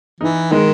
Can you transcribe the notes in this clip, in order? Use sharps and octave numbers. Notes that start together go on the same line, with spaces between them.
E3 D#4
D#3 G#3